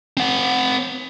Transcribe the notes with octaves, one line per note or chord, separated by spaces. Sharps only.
C4 F#5